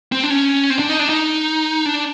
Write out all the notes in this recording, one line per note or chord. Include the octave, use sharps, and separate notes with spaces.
C4
D4
C#4
C4
D4
D#4
D4
D#4
D4